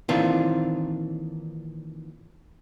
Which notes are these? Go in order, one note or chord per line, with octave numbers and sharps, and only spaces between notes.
A#2 D#3 E3 C4 D4 F4